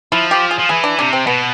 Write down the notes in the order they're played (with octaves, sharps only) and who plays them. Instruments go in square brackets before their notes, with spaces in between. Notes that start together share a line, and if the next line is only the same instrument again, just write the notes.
[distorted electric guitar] F3 [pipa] E4
[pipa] G4
G#4
[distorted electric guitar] F3
[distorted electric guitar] E3 [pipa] G#4
[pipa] D4
[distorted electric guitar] C3 [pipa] D4
[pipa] C4
[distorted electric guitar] B2 [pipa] B3